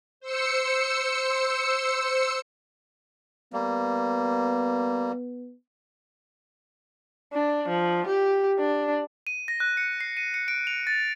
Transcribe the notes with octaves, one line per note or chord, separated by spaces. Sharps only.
C5 E6 C#7
G3 A#3 B3
D4
F3
G4
D4
D#7
A#6
F#6
C#7
C7
D#7
C#7
D7
F7
A6